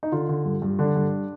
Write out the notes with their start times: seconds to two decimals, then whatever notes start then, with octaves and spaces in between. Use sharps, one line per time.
0.03 D#4
0.12 D3 F4
0.29 D3
0.45 G2
0.62 G2
0.79 D3 D4
0.96 G2